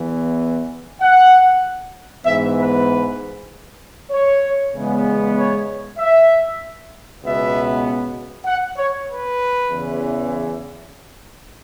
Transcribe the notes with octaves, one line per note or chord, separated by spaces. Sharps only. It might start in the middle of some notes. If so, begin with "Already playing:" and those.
Already playing: E2 E3 B3
F#5
G#2 E3 B3 E5
B4
C#5
E2 C#3 G#3 B3
C#5
E5
C#2 B2 B3 E5
F#5
C#5
B4
E2 C#3 E3